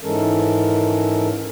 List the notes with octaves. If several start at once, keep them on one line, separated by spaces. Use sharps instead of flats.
G#2 E3 G#3 C#4 A4 A#4